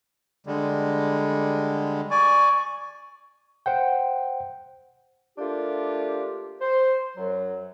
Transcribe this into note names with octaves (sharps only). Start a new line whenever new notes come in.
D3 G3 G#3
D5 G#5 C#6
C5 F#5 G5
A3 A#3 D4 F4 G4
C5
F#2 F#3